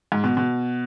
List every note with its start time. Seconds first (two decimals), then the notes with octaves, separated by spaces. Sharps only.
0.12 G#2
0.24 B2
0.37 B2